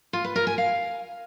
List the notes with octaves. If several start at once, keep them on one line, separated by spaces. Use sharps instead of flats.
F4
B4
A#4
G#5
F5